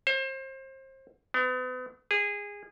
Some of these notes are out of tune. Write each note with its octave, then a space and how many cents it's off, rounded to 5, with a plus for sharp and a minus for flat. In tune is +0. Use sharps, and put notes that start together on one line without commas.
C5 +30
B3 +40
G#4 -20